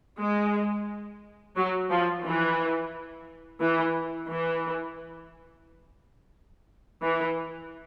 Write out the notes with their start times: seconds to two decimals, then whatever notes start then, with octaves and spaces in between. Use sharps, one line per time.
0.19 G#3
1.56 F#3
1.90 F3
2.24 E3
3.61 E3
4.29 E3
7.02 E3